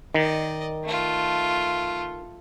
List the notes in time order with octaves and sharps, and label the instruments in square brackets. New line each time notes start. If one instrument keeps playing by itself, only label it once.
[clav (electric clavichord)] D#3 [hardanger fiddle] D5 D#5
[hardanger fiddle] A3 F4